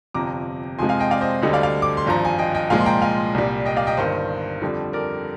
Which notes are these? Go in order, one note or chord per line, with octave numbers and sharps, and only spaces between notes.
G1 F2 C3 A#5 D6
F2 C3 F3 G#3 G#5 C6
F5 G#5
D#5 G5
D5 F5
C5 D#5
D2 D3 G3 C5 D#5
D5 F5
D5 F5
D6
C6
G#1 G2 F3 A#5
G#5
D#5 G5
D#5 G5
C2 A#2 F3 G#3 F5 G#5
C6
G5 A#5
F5 G#5
C2 A#2 G3
D#5 G5
D5 F5
D#5 G5
G1 G2 D#3 C5 D#5
F2 D3 G3
A#4 D5